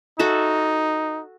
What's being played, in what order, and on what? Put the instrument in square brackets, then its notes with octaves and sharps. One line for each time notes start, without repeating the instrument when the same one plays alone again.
[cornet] D#4 [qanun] F#4 A4 E5